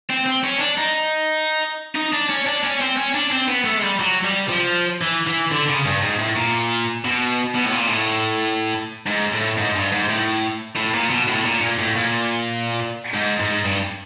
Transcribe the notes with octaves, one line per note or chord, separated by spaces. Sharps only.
C4
C4
C#4
D4
D#4
D#4
D4
C#4
D4
C#4
C4
C#4
D4
C4
B3
A3
G#3
G3
F#3
G3
F3
E3
E3
D3
C#3
G2
G#2
A2
A#2
B2
B2
A2
A#2
A2
G#2
A2
G#2
G2
G#2
A2
A2
A#2
B2
A2
A#2
A#2
A2
A#2
G#2
G#2
G2